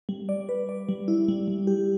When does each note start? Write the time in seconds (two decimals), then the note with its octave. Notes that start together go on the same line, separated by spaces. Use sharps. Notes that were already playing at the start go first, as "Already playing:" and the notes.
0.09 G3
0.29 D5
0.49 B4
0.69 D5
0.89 G3
1.08 E4
1.28 G3
1.48 G3
1.67 G4